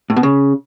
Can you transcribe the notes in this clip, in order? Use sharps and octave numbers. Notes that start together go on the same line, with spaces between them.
A2
B2
C#3